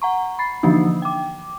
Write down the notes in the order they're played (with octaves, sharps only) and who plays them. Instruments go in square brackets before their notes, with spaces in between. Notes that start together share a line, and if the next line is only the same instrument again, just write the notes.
[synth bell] F#5 A#5 C#6
B5 A6 C7
D3 E3 F3 A#3 D4 D#4
G5 D6